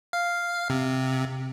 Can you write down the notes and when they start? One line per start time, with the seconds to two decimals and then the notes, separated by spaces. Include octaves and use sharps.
0.13 F5
0.70 C3